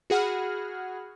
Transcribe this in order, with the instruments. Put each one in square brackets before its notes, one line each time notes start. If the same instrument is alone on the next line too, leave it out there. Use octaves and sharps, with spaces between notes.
[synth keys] F#4 G#4 F#5 B5 F6